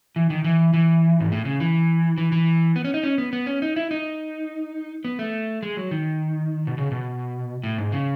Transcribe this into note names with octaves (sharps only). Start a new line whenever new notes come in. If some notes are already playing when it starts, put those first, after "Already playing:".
E3
D#3
E3
E3
G#2
A2
C#3
E3
E3
E3
B3
C#4
D#4
C#4
B3
B3
C#4
D#4
E4
D#4
B3
A3
G#3
F#3
D#3
B2
C#3
B2
A2
G#2
C#3